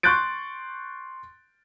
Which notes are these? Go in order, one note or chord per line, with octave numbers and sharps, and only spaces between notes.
C6 C#6 F#6 G6 A6 D7